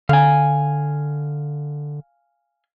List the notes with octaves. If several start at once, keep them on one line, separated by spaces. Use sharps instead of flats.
D3 F5 G#5